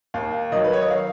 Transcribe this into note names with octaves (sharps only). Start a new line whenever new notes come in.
D#2 F5
D#3 F#3 D#5
B4
C#5
D#5
F5